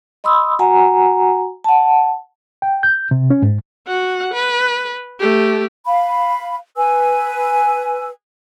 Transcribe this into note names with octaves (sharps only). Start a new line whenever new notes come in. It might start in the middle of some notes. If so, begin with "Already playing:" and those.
D#5 B5 C6 D#6 E6
F#4 F#5 G#5 A#5
F#5 A5
G5
G6
C3
C#4
G#2
F#4 F#5
B4
A3 G4
F5 B5
B4 G#5 E6